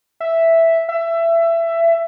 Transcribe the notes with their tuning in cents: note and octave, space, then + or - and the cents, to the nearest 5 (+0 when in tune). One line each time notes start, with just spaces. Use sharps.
E5 +0
E5 +20